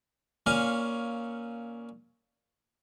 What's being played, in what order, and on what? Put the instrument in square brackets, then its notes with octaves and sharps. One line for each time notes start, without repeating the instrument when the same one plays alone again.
[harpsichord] A#2 C#4 F5